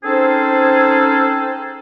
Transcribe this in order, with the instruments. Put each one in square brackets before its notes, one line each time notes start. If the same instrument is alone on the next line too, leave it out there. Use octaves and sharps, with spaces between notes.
[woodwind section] C4 C#4 D#4 G#4 A4 C5